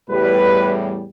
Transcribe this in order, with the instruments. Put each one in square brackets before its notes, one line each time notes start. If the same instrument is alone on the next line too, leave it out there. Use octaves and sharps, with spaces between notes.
[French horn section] E2 A2 G3 [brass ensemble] B4